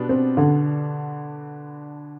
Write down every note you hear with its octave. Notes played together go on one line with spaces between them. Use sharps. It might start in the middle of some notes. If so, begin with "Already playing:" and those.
Already playing: B2 B3 D4 G4
C4
D3